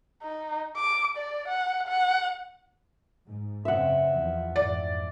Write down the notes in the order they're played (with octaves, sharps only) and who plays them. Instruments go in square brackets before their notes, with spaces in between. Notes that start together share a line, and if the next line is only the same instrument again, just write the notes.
[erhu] D#4
D6
D5
F#5
F#5
[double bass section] G#2
[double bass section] F#1 C#3 C4 [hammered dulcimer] E5 F#5
[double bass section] E2 F3
[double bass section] F2 G#2 E3 [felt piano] D5